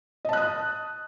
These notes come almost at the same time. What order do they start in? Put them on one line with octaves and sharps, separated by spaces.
D#5 A5 F#6 D#6